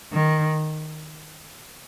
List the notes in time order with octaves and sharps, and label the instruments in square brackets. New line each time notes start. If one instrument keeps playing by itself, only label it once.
[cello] D#3